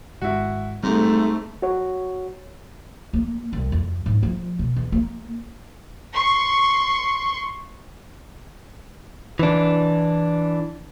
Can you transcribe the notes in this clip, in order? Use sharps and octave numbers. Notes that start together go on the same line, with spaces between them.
G#1 G#3 E4 F#4
G#2 C3 G3 A3
F#4 C#5
A#3
C2
F2
G#2
F3
B2
E2
A#3
C6 C#6 C#7
E3 D4